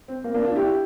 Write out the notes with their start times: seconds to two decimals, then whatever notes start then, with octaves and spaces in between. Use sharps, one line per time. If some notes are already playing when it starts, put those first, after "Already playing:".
0.08 C4
0.24 A#3
0.34 A#3 D4
0.45 D4 F4
0.55 E4 G4